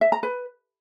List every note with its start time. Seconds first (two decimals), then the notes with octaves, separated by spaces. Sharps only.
0.01 E5
0.12 A#5
0.23 B4